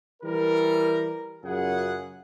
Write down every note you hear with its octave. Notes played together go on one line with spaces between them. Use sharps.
E3 G3 A#4
F#2 C#3 F4 G#4 F#5